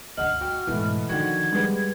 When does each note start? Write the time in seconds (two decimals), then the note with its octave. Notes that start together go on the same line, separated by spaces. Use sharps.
0.17 G1 D2 D#5 F#5 F6 F#7
0.41 F#4 G5
0.67 G#2 B2 E3 A3 B3
1.09 D3 D#3 F3 F#4 G#6
1.52 G3 G#3 B3